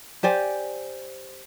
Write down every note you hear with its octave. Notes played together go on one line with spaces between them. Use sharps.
G4 C5 D5 G#5